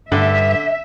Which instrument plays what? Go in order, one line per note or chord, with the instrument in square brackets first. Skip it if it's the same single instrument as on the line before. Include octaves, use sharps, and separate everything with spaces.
[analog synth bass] G2 [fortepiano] D3 [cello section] E5